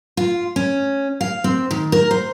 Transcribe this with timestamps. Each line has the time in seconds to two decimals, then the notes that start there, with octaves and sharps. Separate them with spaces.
0.17 F4
0.56 C#4
1.21 F5
1.44 C4
1.71 D#3
1.92 A#4
2.11 C5